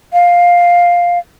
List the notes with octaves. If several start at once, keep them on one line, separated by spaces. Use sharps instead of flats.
F5